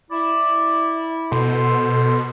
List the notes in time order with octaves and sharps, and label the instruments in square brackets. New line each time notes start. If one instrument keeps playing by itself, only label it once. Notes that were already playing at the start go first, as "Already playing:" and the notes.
[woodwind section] E4 [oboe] D5
[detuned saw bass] B2 [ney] A4 [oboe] C5